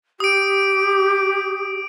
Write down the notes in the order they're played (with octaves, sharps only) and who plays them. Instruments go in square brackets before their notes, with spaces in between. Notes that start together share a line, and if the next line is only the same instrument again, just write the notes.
[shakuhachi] G4 [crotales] D#6 D7